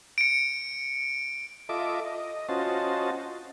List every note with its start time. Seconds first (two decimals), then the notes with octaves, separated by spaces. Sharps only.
0.18 C#7 D7
1.69 F4 A4 D#5 E5 D6
2.06 D#5
2.49 C#4 F4 F#4 C5 D#5 A5